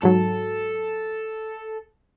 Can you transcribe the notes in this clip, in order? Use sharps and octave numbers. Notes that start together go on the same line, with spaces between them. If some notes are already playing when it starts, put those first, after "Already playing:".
G#2 F#3 A4